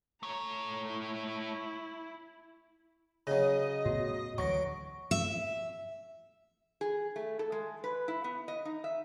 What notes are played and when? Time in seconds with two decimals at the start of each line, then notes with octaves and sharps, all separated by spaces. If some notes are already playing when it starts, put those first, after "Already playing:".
0.23 A3 C#5 A#5
0.91 E4
3.27 C#3 F#3 D#5
3.85 A2 B3 F#4
4.38 D2 D3 E3 F#3 C#6 A#6 D7
5.11 E5
6.81 G#4
7.16 A3
7.39 A4
7.52 G#3
7.84 B4
8.08 E4
8.24 B3
8.48 D#5
8.65 D#4
8.84 E5